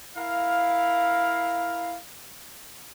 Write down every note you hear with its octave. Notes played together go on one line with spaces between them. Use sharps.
E4 A#4 F5